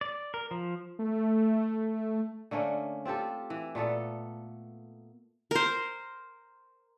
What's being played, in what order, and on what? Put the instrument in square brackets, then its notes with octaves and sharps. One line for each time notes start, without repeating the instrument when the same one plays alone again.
[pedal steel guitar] D5
A#4
F3
[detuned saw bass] A3
[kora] D3 A3 A#3 C#4
C4 F4 G4 A4
E3
A#2 A3 B3 A4
[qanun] A#4 C5